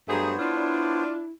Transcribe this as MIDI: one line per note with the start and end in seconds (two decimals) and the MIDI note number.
0.09 0.37 43
0.09 0.34 54
0.09 0.34 57
0.09 1.04 59
0.09 0.34 68
0.09 1.04 72
0.09 1.04 73
0.09 0.29 82
0.39 1.27 62
0.39 1.31 64
0.39 1.12 65